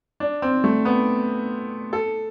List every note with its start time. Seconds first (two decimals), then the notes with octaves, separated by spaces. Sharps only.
0.20 D4
0.42 C4
0.64 A3
0.85 B3
1.93 A4